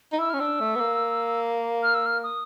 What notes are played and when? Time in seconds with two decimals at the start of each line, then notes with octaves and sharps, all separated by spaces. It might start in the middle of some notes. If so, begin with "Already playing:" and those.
0.12 D#4
0.19 E4 E6
0.30 C#4 F6
0.40 D4 E6
0.60 A3
0.75 B3
0.80 A#3
1.83 F6
1.95 E6
2.06 F6
2.24 D#6